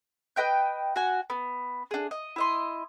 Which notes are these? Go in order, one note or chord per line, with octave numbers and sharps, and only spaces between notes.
B4 D#5 G5 G6
F#4 G#5
B3
D4 G#4
D#5
E4 D#5 C6